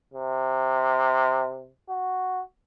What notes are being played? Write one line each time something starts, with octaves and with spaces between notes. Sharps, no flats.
C3
F#4